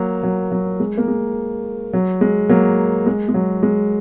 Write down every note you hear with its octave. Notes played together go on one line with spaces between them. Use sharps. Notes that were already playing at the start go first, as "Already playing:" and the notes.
Already playing: F#3 A#3
F#3
F#3
G#3
A#3
G#3
F#3
G#3
F#3 A#3
G#3
G#3
F#3
G#3